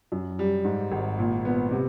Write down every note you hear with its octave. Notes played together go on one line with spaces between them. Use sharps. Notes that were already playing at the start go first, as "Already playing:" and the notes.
F#2
G3
G#2
G#1
A#2
B3
C3